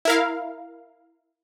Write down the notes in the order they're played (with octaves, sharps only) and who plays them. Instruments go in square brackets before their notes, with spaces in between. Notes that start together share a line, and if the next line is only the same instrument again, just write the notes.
[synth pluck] E4 A#4 F5